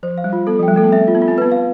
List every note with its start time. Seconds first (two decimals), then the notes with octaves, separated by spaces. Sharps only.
0.03 F3 C5
0.18 F5
0.24 G3
0.33 F4
0.47 B3 A4
0.59 F3
0.63 G3 G5
0.76 A3 A4
0.84 B3
0.92 C4 E5
1.08 F4
1.15 B3
1.22 F4
1.28 C4
1.38 B3 B4
1.52 F5